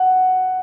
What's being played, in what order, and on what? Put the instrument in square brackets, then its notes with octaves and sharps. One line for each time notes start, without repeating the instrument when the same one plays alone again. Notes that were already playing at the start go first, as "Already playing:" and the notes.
Already playing: [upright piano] F#5